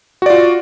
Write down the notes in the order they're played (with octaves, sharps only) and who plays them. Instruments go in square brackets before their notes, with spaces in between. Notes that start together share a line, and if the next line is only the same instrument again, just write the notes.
[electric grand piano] F#4
D5
F4